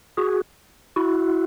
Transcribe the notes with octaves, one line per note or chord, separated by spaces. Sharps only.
F#4 G#4
E4 F#4